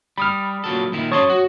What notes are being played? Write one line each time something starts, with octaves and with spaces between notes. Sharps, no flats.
G3 B5 D#6 F6
A#2 F#3 A4
A#2 D#3 E4
F#2 C#5 A5 C6 C#6 D#6
F#4